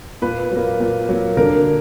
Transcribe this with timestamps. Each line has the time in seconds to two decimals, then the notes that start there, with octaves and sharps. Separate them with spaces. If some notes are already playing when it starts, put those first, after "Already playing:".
0.22 A#2 B4
0.51 F#3 A#3
0.80 A#2
1.09 F#3 A#3
1.37 D3 A#4